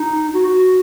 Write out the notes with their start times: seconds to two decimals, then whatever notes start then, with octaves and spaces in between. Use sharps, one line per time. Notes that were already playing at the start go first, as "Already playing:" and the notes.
Already playing: D#4
0.34 F#4
0.48 F#4